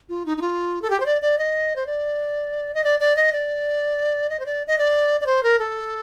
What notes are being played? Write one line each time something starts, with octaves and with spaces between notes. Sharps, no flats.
F4
D#4
D#4
F4
A4
G4
C5
D5
D5
D#5
C5
D5
D#5
D5
D5
D#5
D5
D#5
C5
D5
D#5
D5
D5
C5
A#4
A4